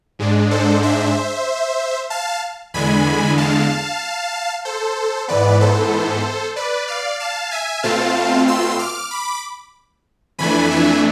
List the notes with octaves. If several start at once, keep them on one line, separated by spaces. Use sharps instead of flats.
G#2 G#3 D4
A4 C5
C5 E5
F5 A5
E2 D3 G#3 G#5 B5
F5 A5
A4 C5
G#2 E3 B3 B4 D5
A4 C5
B4 D5
D5 F5
F5 A5
E5 G#5
B2 A3 C4 F4 F5 A5
C6 E6
D6 F6
B5 D6
F2 E3 A3 D4 G#5 B5
E5 G#5